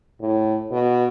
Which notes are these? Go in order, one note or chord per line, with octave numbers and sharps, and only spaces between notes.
A2
B2